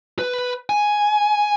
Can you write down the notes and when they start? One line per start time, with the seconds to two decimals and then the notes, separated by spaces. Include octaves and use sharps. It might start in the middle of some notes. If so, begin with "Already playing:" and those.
0.19 B4
0.69 G#5